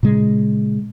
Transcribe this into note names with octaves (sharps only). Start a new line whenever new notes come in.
A#2 C#3 G#3